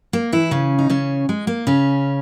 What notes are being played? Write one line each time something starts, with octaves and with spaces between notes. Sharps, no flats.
A#3
E3 E4
C#3 C#4
D#4
C#3 C#4
G#3
A#3
C#3 C#4